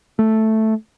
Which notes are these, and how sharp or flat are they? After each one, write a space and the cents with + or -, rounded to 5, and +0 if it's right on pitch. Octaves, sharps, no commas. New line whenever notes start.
A3 +0